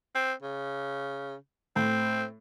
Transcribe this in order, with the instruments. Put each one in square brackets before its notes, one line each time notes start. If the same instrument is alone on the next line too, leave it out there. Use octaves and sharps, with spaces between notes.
[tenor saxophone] C4
C#3
[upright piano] A2 [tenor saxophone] C4